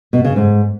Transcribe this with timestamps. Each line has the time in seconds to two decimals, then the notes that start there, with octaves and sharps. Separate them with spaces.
0.13 B2
0.25 C#3
0.36 G#2